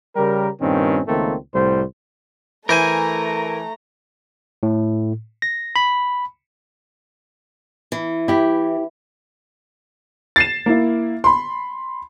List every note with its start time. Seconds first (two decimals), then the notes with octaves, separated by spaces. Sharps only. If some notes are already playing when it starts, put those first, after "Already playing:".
0.16 C#3 G3 G4 A#4
0.61 G2 A#2 D#3 C4 C#4
1.08 C#2 D#3 A3 A#3 C4
1.54 C2 A2 G3 C5
2.69 E3 A3 E4 A#4 C5 G#5 A#5
4.63 A2
5.42 A#6
5.76 B5
7.92 E3
8.28 E4 G4
10.36 A6 C7 E7
10.66 A#3 E4
11.24 B5 C6